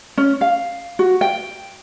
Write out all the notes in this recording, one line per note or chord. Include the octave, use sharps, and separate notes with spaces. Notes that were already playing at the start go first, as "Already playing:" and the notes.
C#4
F5
F#4
G5